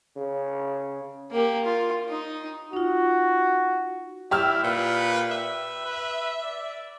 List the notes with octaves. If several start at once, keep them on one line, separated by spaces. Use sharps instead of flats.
C#3
A#3 G4
F4
D#4
D#4 F4 F#4
E4 G4 D5 E6 F6
A#2 B4
B4 E5
B4
D5